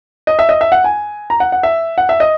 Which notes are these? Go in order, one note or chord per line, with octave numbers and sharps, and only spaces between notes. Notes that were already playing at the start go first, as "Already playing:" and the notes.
D#5
E5
D#5
E5
F#5
G#5
A#5
F#5
F#5
E5
F#5
E5
D#5